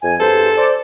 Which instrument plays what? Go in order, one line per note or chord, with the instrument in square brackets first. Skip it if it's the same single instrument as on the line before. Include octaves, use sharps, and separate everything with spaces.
[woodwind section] F2 G#5
[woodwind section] E2 G2 C5 [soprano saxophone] A4
[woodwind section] C5 D5